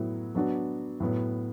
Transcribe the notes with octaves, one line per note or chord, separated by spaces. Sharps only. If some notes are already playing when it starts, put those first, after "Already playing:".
Already playing: A2 F#3 B3 E4
F#3 B3 D4 F#4
A2 F#3 B3